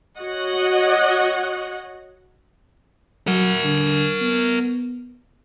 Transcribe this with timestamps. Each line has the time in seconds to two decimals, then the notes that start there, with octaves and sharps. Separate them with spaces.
0.18 F#4 C#5 D#5 F#5
3.27 F#3 A#4 F#5
3.64 D3
4.21 B3